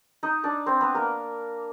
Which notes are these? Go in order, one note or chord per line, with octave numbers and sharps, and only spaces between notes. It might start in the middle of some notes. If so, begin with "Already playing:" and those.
D#4 D#5
D4 D5
C4 C5
B3 B4
A#3 A#4